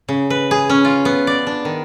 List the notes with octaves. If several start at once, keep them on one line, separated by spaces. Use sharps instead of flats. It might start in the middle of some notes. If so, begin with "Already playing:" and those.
C#3
B4
G#4
C#4
F4
B3
D5
D4
D#3